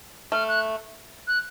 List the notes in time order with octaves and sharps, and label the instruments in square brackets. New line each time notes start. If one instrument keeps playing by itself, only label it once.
[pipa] A3 [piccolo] F6
[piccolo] F#6
F#6